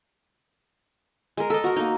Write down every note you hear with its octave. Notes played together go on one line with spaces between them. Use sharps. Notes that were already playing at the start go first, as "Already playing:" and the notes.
G#3 A#4
A4 D#5
F#4 A#4
A#3 D#4